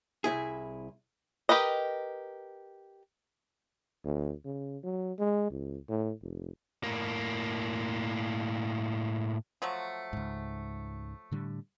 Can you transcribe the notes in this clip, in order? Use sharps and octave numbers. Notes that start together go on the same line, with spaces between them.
C2 E4 G#4
G4 A#4 B4 D#5
D2
C#3
F#3
G#3
C#2
A2
F1
A2 A#3
F3 F#3 A3
C#2 G#2
A2 D3 G3